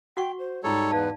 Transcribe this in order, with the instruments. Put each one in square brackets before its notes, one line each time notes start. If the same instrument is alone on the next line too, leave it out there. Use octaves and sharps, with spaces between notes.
[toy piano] F#4 F#5 C#6 [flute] G5
[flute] C5
[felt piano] G#2 D#4 [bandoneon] G3 A4 C#5 [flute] A#5
[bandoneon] E2 [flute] B4 [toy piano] D5 F5 A5